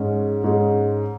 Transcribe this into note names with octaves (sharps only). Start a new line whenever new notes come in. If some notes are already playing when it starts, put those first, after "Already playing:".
Already playing: G#2 G#3 C#4
G#2 G#3 C#4